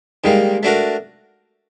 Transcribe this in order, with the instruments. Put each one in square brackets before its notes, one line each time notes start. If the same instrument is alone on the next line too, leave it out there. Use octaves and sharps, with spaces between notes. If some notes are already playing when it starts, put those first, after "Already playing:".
[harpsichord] D#3 G3 A#3 [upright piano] G#3
[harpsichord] A3 D4 F#4 A#4